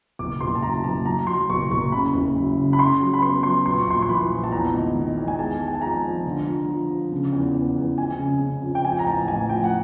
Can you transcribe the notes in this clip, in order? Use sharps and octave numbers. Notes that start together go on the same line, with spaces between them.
F#1 D6
F#1 C6
A5
F#2 A#5
A#5
F#1 A5
F#3 A#5
F#3 C6
F#1 C#6
F#1 C#6
C#3 B5
F#1
F#2
C#3
B5
C#3 C6
F#3
B5
B3 C6
F#3 C6
A#1 C6
C#6
A#1 C6
C6
E3 B5
A#1
A5
E2 A#5
D#3
D#3
E2
G#5
G#3 A5
G#3
G#5
A5
F2 A#5
F3
D3
F3
F3
F3
C#3
E2
E2
E2
F2 G#5
C#3
C#3
F2
G5
F3 G#5
A#5
A1 A5
A1 G#5
F3 G5
F#5